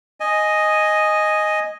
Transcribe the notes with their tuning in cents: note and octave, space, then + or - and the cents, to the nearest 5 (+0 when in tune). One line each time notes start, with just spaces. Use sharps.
D#5 +0 G#5 +0